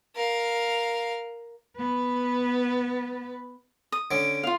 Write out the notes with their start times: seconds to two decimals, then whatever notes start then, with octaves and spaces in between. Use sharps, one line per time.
0.16 A#4 F5
1.77 B3 B4
3.92 D#6
4.11 D3 C#4 D7
4.43 F4 F5 F7